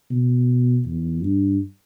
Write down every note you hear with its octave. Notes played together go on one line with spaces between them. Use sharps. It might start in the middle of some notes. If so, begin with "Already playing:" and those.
B2
E2
G2